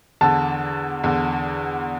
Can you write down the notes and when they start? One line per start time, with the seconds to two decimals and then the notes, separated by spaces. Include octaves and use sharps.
0.21 E2 D3 A5
1.04 E2 D3